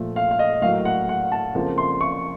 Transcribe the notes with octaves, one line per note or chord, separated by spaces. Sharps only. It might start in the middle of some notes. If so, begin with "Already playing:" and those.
Already playing: A#2 F3 A3
F5
F5
D#5
A2 F#3 A#3 F5
F#5
F#5
A5
F2 C#3 F3 A#3
C6
C#6